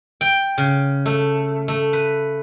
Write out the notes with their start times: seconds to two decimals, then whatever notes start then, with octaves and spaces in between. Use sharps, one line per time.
0.21 G5
0.58 C#3
1.06 A3
1.68 A3
1.93 B4